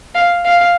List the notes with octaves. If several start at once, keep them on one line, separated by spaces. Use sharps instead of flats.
F5
F5